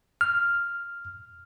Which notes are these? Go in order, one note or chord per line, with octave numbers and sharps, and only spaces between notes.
F6